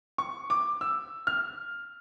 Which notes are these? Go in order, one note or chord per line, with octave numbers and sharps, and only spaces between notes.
C#6
D6
E6
F6